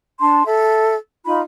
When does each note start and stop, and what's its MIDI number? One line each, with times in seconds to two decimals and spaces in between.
0.21 0.42 62
0.21 0.42 81
0.21 0.42 84
0.46 0.94 69
0.46 0.94 76
1.25 1.40 63
1.25 1.40 65
1.25 1.40 83